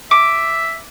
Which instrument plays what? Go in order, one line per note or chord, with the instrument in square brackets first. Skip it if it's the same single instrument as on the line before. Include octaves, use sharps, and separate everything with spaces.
[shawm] E5 [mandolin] D6